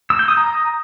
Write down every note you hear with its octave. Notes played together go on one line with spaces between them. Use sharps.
E6
G6
D#6
A#5